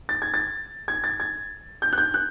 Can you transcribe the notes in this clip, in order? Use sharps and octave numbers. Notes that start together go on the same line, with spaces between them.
A6
G#6
A6
G#6
A6
G#6
G6
F#6
G6
F#6